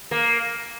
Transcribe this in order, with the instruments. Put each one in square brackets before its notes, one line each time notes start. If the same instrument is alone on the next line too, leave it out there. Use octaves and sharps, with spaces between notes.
[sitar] A#3